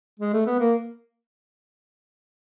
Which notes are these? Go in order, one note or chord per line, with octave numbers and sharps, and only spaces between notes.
G#3
A3
B3
A#3